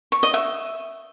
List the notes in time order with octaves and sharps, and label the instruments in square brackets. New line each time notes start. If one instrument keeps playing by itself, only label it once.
[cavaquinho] C#6
D#5
E5